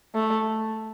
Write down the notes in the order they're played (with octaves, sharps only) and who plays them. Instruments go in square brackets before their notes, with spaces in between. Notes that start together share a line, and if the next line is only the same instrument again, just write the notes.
[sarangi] A3